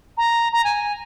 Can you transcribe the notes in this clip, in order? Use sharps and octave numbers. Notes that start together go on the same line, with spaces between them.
A#5
A#5
G#5